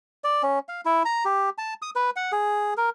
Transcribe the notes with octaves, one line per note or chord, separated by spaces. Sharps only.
D5
C#4
F5
E4
A#5
G4
A5
D#6
B4
F#5
G#4
A#4